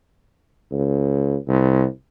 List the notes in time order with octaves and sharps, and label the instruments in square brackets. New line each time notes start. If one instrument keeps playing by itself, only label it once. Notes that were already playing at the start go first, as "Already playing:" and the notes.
[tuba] C#2
C2